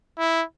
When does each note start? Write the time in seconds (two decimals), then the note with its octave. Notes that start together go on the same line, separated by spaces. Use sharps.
0.19 E4